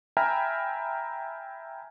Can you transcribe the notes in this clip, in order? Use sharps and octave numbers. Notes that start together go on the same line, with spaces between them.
E5 G5 G#5 A#5 B5 F6